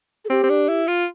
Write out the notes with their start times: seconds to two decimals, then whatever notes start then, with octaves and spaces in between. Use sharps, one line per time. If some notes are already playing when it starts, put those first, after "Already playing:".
0.25 A4
0.30 C4 G4
0.44 C4
0.49 D4
0.69 E4
0.88 F4